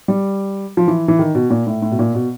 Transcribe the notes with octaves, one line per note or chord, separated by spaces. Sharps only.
G3
F3
E3
E3
D#3
B2
A#2
A2
A2
B2
A#2
B2